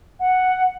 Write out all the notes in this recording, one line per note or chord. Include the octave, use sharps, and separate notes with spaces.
F#5